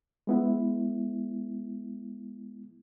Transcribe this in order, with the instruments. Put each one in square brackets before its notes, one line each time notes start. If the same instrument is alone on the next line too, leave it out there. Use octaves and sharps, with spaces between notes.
[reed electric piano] G#3 B3 E4